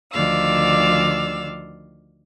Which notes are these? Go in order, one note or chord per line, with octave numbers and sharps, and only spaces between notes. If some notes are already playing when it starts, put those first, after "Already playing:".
D2 D#3 F3 D5 F5 E6